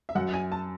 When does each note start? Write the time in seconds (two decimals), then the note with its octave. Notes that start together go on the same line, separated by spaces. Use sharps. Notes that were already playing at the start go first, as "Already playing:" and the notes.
0.09 E5
0.15 F#2 F#5
0.33 G#5
0.52 A5